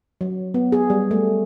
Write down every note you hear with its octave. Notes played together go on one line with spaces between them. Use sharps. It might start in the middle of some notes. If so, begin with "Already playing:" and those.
F#3
B3
G#4
G3
A3